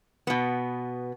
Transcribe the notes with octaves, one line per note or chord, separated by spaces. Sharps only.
B2 B3